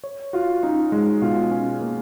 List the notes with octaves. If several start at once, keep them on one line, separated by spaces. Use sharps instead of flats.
C#5
F4 F#4
C#4 D#4
G#3
B2 F4
C#4
A#3